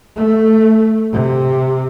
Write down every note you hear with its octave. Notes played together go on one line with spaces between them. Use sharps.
A3
C3